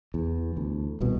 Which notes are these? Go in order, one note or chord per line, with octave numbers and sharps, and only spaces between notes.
E2
D2
D#1 C2 B2